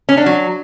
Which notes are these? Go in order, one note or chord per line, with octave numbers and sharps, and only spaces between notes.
C#4
D4
F#3